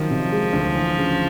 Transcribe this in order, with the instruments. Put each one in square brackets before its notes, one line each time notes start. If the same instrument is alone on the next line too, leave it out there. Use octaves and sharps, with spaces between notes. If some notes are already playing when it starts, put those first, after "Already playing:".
Already playing: [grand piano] D#3 F#3 [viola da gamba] F3
[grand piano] C3
G#3
D2
E3
C#3